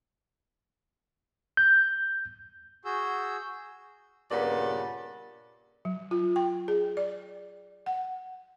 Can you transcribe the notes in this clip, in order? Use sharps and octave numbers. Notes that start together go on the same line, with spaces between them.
G6
F#4 G#4 E6 G6
G2 A#2 C#3 B3 D5
F#3
F4
G5
G#4
D5
F#5